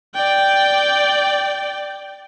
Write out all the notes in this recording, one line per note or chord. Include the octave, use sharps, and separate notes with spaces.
D5 G5